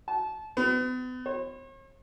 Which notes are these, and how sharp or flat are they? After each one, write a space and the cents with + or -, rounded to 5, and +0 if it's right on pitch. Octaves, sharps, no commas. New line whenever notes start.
A5 -25
B3 +40
C#5 -45